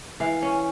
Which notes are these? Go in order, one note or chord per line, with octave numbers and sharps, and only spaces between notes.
E3 F5
C#4